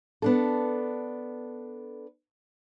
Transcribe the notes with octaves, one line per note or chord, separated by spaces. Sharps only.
B3 D4 A4